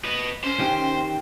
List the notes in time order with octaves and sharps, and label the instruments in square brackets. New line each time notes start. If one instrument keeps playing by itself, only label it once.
[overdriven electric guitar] B4 D#5
[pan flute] C#4 [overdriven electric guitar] C5
[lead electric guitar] D#3 G4